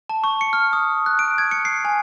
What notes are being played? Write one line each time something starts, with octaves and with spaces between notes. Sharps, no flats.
A5
C#6
C#7
F6
D#6
F#6
D7
G#6
C#7
C7
G#5